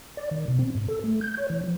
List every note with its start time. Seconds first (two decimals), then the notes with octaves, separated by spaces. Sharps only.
0.17 D5
0.31 D#3
0.48 B2
0.59 C4
0.75 G#2
0.88 A4
1.04 A3
1.21 G6
1.37 C#5
1.50 E3
1.64 F3